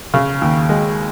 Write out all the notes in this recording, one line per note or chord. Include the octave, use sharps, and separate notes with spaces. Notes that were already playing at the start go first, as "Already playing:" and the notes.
C#3
D#2
G#3